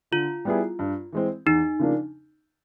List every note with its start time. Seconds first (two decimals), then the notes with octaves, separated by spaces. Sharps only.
0.12 D3 F4
0.45 G3 B3 E4 G#4
0.79 G2
1.12 E3 G#3 C4
1.46 E2 D#4
1.79 C#3 F3 A#3 D4